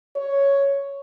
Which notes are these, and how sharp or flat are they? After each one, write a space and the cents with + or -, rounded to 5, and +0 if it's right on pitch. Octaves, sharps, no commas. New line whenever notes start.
C#5 +5